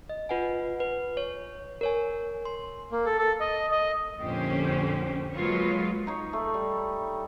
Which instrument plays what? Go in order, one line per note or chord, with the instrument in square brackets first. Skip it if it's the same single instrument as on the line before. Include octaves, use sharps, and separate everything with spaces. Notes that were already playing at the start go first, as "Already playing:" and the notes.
[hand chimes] D#5
F4 B4 F#5 G#5
B4
C#5
A#4 C#5 G#5
C6
[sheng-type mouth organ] A#3
A4
A4
D#5
D#5
[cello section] F2 A#2 D3 C#4 G4 C5
F#3 G#3 A#3 F4 B4 C#5
[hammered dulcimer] D#4 C#5
A3
G3